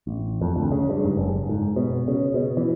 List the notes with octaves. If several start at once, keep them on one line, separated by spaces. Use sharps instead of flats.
A1
F2
D2
C#3
G2
G#2
F#1
G#2
B2
C#3
B2
E3